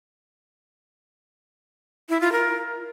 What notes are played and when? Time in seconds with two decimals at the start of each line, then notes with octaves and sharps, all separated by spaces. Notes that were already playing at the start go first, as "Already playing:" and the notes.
2.09 E4
2.21 F4
2.32 A#4